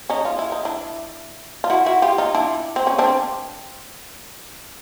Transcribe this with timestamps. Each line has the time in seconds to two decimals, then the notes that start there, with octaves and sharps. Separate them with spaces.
0.10 C#4 D#4
0.25 F4
0.39 E4
0.52 D#4
0.65 D4 E4
1.64 F4
1.70 E4 F#4
1.86 E4 F#4
2.02 F4 G4
2.18 D#4 F4
2.34 D4 E4
2.76 C4
2.87 C#4
2.99 C4 D4